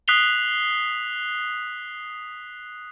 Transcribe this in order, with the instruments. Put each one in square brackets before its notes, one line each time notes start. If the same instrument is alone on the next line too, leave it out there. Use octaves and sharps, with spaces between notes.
[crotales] D#6 F#6 B6 C7 F7 G7